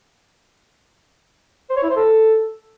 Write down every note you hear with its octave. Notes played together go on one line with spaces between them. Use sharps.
C5
C#5
E4
C5
A4